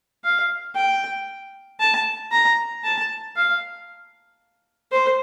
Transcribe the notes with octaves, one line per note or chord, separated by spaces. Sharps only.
F5
G5
A5
A#5
A5
F5
C5